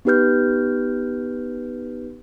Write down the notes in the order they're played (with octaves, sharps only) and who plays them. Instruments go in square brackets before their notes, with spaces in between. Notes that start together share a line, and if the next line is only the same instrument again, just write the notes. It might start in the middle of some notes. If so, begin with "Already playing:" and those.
[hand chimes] B3 D#4 G4 B4 F6 G6